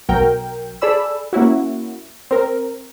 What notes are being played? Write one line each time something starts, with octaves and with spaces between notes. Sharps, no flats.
B1 F#3 A#4 G5
G#4 A4 D5 B5 E6
A#3 C#4 E4 F#4
C4 A#4